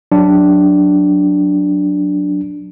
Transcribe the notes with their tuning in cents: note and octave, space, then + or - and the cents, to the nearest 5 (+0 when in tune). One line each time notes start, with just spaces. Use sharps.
F#3 -10 D4 +0